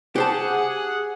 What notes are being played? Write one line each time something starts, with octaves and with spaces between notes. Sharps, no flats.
G4 G#4 C5 F#5 A5